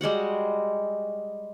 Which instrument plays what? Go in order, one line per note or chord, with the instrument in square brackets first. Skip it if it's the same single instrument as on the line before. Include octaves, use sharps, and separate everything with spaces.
[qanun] G3 G#3 F#4 F#5